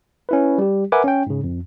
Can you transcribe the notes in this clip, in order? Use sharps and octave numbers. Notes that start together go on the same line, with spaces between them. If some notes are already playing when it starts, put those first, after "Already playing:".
C#4 E4 B4
G3 G4
A#4 B4 E5 F#5 G#5 D6
C#4 G5
G#2 C#3
F2